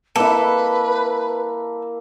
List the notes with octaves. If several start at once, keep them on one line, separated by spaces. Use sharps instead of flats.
A#3 E4 A4 B4